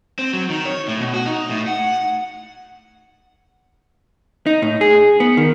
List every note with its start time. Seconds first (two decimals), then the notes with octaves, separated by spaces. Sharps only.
0.19 C4
0.33 F#3
0.50 D#3
0.65 C#5
0.88 A2
1.00 B2
1.13 F#4
1.26 D#4
1.49 A2
1.67 F#5
4.46 D#4
4.62 A2
4.81 G#4
5.20 B3
5.37 D#3